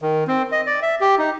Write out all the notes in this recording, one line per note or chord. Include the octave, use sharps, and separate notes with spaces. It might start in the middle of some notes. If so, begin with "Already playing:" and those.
D#3
C4
D#5
D5
E5
G4
D#4